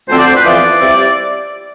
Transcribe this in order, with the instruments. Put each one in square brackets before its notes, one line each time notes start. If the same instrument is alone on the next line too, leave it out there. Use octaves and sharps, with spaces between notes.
[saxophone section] D2 D3 F3 C4 [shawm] C5
[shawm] D5
C5
B4
[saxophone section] F2 E3 B3 F4 [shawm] D5
[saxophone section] G3 C4 E4